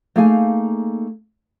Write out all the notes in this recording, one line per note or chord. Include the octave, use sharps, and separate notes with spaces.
A3 A#3 D#4 G#4 F5 G#5